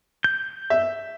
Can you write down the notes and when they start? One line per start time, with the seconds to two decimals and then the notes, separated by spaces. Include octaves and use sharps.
0.24 G6
0.70 E5